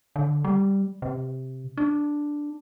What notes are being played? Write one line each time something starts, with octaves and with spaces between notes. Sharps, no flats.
D3
G3
C3
D4